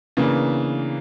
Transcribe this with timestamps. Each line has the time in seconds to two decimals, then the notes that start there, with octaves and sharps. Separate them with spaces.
0.17 C#3 E3 A#3 B3 D4